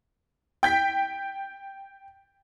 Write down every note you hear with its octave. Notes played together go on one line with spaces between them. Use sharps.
G5 G6 B6